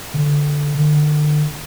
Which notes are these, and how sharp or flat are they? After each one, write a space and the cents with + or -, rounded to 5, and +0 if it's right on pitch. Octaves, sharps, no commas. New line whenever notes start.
D3 -5
D3 +35